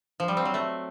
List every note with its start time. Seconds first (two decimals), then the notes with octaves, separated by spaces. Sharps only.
0.20 F3
0.28 G3
0.37 C4
0.45 F#3
0.54 A3